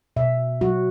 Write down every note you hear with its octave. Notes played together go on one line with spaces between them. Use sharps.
B2 E5
F#3 F#4